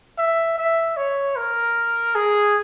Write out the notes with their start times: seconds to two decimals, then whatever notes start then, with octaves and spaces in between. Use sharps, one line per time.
0.18 E5
0.58 E5
0.97 C#5
1.36 A#4
2.15 G#4